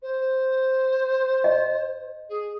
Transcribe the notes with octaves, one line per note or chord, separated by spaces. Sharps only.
C5
D#5
G#4